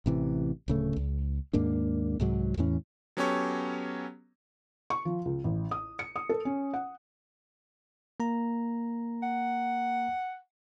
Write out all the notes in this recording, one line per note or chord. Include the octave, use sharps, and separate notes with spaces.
A1 C3 E3
D1 C#3 A3
C#2
D#2 G#2 A#3 D4
C2 G#2 F#3
E2 A2 E3 C#4
F#3 B3 C#4 G4 A4 C#5
C#6
F3
C#2
A1
D#6
C#7
D#6
A4
C#4
F#5
A#3 A#5
F#5